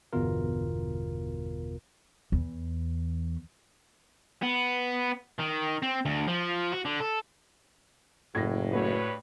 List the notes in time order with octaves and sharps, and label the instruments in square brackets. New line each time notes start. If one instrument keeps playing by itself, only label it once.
[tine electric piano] G1 E2 B2 F4 A#4
[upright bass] E2
[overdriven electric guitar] B3
D#3
C4
D2
F3
F#4
D3
A4
[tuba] F#1 [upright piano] A2 [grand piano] G#6 A#6
[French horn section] G2 B4 C#5 [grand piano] A3 F#4